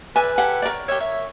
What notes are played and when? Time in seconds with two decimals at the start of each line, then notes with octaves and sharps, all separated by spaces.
0.16 B4 D5 E5 G#5
0.38 G4 A4 F#5 G#5
0.62 A#4 C#5 D5
0.88 G4 C#5 E5
1.00 C#5 E5